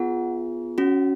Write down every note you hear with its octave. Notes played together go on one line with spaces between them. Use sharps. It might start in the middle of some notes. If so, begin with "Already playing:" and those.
Already playing: B3 F4 G#4 F#5
C#4 F#4